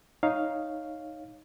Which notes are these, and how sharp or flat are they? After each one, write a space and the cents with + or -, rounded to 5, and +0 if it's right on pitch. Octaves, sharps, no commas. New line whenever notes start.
D#4 +0 C#5 +0 F5 +0